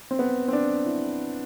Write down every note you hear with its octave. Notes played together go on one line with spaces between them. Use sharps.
C4
B3
C4
D4
E4